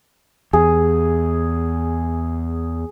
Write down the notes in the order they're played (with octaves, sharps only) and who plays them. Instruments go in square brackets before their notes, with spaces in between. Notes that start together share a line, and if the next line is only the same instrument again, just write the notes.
[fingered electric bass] E2 [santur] G#4